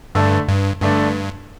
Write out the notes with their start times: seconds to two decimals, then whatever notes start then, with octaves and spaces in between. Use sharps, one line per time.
0.15 G2 D3 A3 D4
0.49 G2
0.82 G2 D3 A3 D4